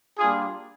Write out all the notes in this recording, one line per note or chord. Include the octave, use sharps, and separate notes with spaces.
G3 A#3 D4 F4 G#4